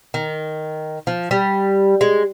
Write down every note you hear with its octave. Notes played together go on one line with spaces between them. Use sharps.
D#3
F3
G3
G#3